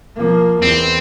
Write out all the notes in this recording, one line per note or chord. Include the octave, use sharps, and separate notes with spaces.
F3 A#3
E2 C4